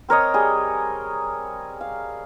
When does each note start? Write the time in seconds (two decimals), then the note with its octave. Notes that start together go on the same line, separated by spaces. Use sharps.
0.09 C4 A#4 C#5 D#5
0.34 G3 G#4
1.81 F5